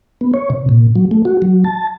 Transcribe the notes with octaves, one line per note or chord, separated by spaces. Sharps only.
B3
C#5
C3
A#2
F#3
A3
F#4
F#3
A5